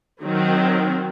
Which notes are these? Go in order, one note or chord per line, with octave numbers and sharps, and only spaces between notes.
D#3 F#3 C4 F#4